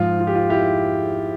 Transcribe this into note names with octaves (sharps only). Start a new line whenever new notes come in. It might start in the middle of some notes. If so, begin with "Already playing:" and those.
Already playing: G#2 F3 F4
F4
G4
F4
E4 G4